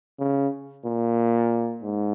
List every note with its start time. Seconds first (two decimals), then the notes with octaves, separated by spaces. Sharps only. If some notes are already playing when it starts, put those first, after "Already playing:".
0.19 C#3
0.84 A#2
1.83 G#2